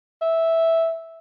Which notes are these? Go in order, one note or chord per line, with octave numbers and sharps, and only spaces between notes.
E5